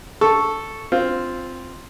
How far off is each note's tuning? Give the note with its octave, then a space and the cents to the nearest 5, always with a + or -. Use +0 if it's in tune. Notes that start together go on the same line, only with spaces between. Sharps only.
A4 +0 C#6 +0
C4 +0 F4 +0